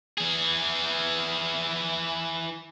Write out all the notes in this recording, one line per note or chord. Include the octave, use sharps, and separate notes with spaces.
E3 G#4